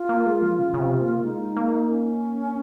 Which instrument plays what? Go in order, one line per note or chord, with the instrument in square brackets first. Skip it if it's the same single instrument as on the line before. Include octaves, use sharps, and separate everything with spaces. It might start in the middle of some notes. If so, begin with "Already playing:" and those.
Already playing: [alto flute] F4
[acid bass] A#3
G#3
F3
[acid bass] C#3 [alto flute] F4
[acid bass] C#3
C3
A#3
[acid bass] G#3 [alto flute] D#4
[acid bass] A#3
[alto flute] C#4